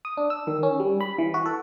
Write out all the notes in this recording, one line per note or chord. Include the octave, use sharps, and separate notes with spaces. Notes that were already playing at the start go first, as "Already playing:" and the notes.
D#6
D4
E6
D#3
C#4
G3
B5
E3
F#4
A4